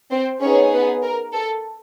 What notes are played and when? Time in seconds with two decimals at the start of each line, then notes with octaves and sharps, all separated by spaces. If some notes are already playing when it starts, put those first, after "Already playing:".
0.11 C4 C5
0.41 B3 C#4 D#4 G#4 C#5
0.73 B3 B4
1.03 A#4
1.34 A4